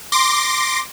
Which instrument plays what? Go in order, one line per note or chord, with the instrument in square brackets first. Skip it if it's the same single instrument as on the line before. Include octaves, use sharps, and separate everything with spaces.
[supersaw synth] C6 D6 A#6